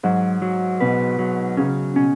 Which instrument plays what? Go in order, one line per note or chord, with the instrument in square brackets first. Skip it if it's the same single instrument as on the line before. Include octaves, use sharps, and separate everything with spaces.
[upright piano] G#2 [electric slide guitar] F#3
[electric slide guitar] F#3
[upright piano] B2 [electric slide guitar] B4
[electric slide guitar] F#3
[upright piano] C#3 [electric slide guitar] C#4
[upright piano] B2 [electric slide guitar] C#4